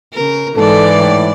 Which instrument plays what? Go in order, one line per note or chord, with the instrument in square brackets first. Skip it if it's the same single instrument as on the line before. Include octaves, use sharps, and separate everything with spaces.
[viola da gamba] C#3 A#4
[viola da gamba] G#2 E3 D5 [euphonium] A4
[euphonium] A2